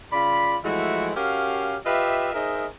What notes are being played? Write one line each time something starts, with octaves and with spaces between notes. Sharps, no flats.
C#3 F4 D5 B5
E3 F3 G#3 A3 E4 F#4
C#4 F#4 G4 A#4 F5
F4 G4 B4 D#5 E5
D#4 G#4 A#4 C5 D#5 E5